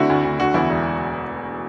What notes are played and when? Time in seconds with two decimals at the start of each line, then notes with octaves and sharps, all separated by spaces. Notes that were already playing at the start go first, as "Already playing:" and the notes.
Already playing: D3 A3 C4 E4 F#4
0.10 D2
0.24 D2
0.39 D3 F#4
0.54 E2 E4
0.69 E1